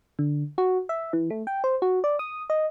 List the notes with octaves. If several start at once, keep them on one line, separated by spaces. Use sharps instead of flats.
D3
F#4
E5
E3
A3
G5
C5
F#4
D5
D#6
D#5